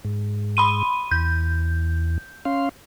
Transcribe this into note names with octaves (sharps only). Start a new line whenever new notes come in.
G#2
B5 C6 D#7
E2 G6
C#4 F5 C6